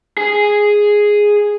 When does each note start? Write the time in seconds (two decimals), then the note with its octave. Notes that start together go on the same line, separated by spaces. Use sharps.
0.18 G#4